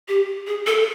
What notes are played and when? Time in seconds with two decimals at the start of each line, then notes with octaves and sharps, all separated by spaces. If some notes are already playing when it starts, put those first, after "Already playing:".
0.08 G4
0.47 G#4
0.67 A4